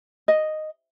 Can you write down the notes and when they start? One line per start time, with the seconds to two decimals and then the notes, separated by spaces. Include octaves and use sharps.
0.28 D#5